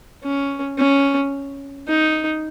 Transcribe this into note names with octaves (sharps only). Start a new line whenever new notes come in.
C#4
C#4
D#4